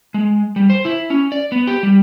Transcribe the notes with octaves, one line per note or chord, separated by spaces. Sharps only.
G#3
G3
C5
E4
C#4
D5
B3
G4
G3